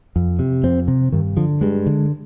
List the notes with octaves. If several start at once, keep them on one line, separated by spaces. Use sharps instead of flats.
F2
C3
F2 C4
C3
G2 D#3
D3 F3
G2 G#3
D3